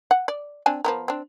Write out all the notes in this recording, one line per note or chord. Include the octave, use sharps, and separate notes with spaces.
F#5
D5
C4 D4 G#5
F3 B3 A#4
C4 D4